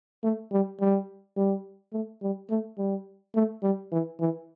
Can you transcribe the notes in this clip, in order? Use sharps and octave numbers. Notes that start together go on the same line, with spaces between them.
A3
G3
G3
G3
A3
G3
A3
G3
A3
G3
E3
E3